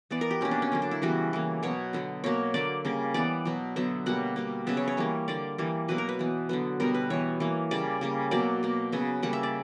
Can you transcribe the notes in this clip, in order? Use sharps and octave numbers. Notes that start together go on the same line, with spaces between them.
E3 B3 D5
A#4
G4
B2 A#3 C#4
D4
C#4
D3 F#3 A#3
D4
E4
C#3 E3 G3 B3 F#4
E3 A#3
B2 F#3 B3 C#5
D3 F#3 B3
B2 A#3 C#5
D3 F#3 A#3 D5
C#3 G3 A#3
E3 B3 D5
B2 F#3 B3
D3 F#3 B3 E5
B2 G3 A#3 F#5
B2 G3 A#3
C#3 F#3 B3 E5
C#5
C#5
E3 G3 A#3
D3 A#3 D5
E3 G3 A#3
B2 F#3 A#3 B4
A#4
B4
E3 B3
D3 F#3 B3
B2 G3 B3 A#4
B4
E3 B3 C#5
E3 A#3
C#3 G3 A#3 D5
C#3 G3 A#3
B2 F#3 A#3 D5
B2 A#3
C#3 F#3 B3
C#3 G3 A#3 F#5
E5
D5